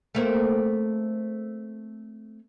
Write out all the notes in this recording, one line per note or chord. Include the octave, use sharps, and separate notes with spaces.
A3 A#3 C4